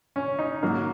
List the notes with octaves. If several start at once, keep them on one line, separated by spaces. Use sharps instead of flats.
C#4
D#4
G#2 F#3 A#3